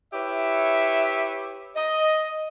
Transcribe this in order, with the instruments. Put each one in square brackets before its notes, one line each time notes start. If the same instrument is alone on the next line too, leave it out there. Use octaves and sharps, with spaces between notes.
[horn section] E4 G4 B4 C#5 E5
D#5